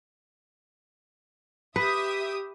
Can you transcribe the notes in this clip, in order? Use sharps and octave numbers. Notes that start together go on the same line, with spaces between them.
G4 B4 E5 D#6